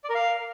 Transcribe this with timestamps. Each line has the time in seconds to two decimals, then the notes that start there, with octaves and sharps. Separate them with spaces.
0.04 D5
0.09 A#4
0.15 F5